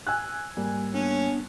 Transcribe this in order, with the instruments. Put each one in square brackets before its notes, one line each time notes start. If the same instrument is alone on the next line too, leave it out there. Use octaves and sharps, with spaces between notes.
[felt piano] G#5 E6 F#6
[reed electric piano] G#2 G3 A#3
[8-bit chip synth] B3 D4 [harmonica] C#4